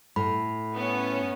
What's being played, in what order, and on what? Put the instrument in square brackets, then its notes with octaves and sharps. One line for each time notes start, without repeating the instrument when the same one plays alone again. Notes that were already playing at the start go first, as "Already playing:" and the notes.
[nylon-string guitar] A2 [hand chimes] B5
[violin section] B3 C#4